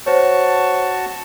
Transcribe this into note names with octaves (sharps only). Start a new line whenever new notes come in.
F#4 C5 C#5 A5 C#6